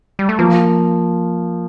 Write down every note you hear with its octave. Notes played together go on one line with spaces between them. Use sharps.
G3
A3
F3 A#3